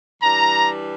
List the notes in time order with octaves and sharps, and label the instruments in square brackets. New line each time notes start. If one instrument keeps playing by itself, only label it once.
[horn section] E3 G3 D4 A#5